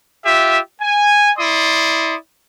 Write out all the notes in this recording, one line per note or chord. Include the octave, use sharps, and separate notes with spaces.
F4 G4 E5
G#5
E4 D5 C6 D#6